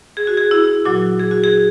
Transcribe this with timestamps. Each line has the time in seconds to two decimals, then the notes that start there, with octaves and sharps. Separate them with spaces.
0.17 G#4
0.27 F#4
0.37 G#4
0.51 E4
0.85 A#2 F#3 F#4
1.19 G#4
1.31 F#4
1.44 G#4